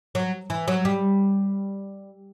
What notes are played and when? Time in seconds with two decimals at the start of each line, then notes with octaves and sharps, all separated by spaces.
0.15 F#3
0.50 E3
0.68 F#3
0.85 G3